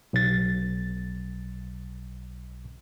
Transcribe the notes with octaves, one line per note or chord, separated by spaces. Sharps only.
B1 A6